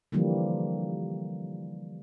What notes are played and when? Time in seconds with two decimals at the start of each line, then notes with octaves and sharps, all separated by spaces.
0.12 D3 E3 F3 G3 A#3